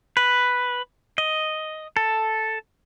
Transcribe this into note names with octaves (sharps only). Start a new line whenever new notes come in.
B4
D#5
A4